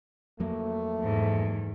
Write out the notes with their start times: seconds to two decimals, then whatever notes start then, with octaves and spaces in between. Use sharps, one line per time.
0.40 F2 F#3 A3 A#3
1.00 E2 G#2